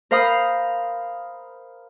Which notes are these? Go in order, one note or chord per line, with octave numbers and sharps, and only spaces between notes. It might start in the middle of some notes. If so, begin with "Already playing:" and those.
A#4 C5 F5 A#5 B5 D#6